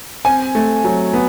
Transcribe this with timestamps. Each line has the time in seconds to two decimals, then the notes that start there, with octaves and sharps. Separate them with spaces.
0.25 C4 G#5
0.55 A3
0.84 F#3
1.13 B3